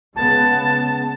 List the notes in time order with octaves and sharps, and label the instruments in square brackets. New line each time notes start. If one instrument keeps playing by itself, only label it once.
[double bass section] C#3 G#3 B3 [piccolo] A5